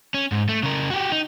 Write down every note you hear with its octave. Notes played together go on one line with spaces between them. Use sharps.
C#4
G#2
A3
C#3 A#4
F#4 G4
D#4